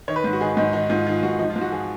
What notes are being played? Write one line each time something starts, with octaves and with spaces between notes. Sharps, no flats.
D#3 C#5
B4
G#2
F#4
D#3 G#4
G#2 D#4
D#3 D#4
G#2 F4
D#3 F4
G#2 F#4
F3 D#4
F4
G#2
F#4
F3 G#4